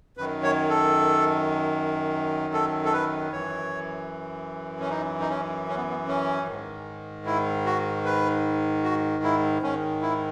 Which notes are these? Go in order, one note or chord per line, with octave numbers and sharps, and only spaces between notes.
F#2 D#3 B4
C#5
A4
A4
A4
B4
F#2 E3 C#5
C#4
D#4
D#4
C#4
C#4
B3
B3
C#4
G#2 D#3
E4
F#4
B4
F#4
E4
G#2 D#3 C#4
E4